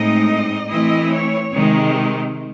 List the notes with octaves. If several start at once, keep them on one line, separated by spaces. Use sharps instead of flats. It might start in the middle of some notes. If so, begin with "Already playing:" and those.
Already playing: A2 G#3 C4 D#4 D#5
E3 A3 C4 E4 D#5
C#5
C3 D#3 G#3